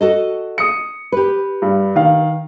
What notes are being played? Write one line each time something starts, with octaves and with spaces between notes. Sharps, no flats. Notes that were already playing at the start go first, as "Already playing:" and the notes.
F#4 A4 D#5
D#6 C#7
G4 B4
G2
D#3 F5